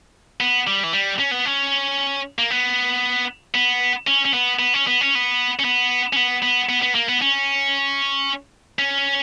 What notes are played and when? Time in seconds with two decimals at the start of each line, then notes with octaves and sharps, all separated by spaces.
0.40 B3
0.67 G3
0.84 E3
0.93 G3
1.19 C#4
1.31 B3
1.46 C#4
2.39 A#3
2.50 B3
3.54 B3
4.07 C#4
4.25 C#4
4.33 B3
4.59 B3
4.74 C#4
4.87 B3
5.01 C#4
5.15 B3
5.59 C#4
5.64 B3
6.13 C#4
6.16 B3
6.42 B3
6.69 B3
6.82 B3
6.95 A#3
7.09 B3
7.22 C#4
8.79 C#4